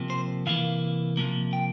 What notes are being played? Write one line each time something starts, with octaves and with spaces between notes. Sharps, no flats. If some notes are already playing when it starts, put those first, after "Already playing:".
Already playing: C3 F3 A#3
C5
C3 E3 A#3 F5
C3 F3 A#3
G5